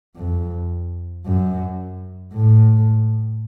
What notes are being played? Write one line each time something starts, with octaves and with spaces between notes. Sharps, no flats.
F2
F#2
A2